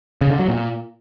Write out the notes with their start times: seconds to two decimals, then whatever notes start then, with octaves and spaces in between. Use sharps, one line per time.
0.21 C#3
0.30 D3
0.39 F#3
0.48 A#2